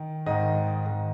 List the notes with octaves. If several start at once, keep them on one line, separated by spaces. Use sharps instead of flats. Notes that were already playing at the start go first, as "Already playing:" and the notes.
Already playing: D#3
G#2 D#3 D#5
G#2 D#3